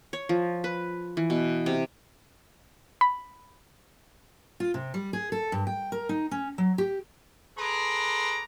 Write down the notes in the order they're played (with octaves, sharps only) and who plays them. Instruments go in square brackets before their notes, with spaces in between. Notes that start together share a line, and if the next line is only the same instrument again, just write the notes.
[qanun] C#5
F3
B4
E3
B2
C3
[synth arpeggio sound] B5
[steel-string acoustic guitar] F4
C3
G3
G#4
A4
G2
G5
A#4
D#4
C#4
F#3
G4
[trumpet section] G#4 A4 B4 A#5 C6 D6